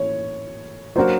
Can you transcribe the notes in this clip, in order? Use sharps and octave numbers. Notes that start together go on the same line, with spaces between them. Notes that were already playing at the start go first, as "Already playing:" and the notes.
Already playing: E3 A3 C#5
F#3 A#3 D4 F#4 A#4 C5